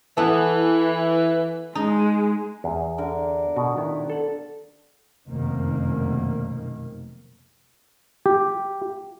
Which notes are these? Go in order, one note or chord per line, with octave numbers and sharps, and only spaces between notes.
E3 B3 A4
G#3 D#4
E2
D3 A#4
B2 F#4
D#3 B3 E4
A4 F#5
F1 F#2 B2 D#3 A#3
G4